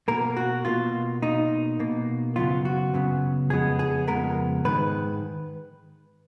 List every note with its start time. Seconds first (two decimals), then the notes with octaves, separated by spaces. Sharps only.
0.08 B2 A#3 A#4
0.37 F#4
0.65 B2 A#3 F4
1.22 B2 A#3 D#4
1.79 B2 A#3
2.36 F#2 C#3 F#3 B3 F4
2.65 F#4
2.93 F#2 C#3 F#3 B3
3.50 F2 C#3 G#3 B3 G#4
3.79 G#4
4.08 F2 C#3 G#3 B3 A#4
4.65 G#2 D#3 G#3 B4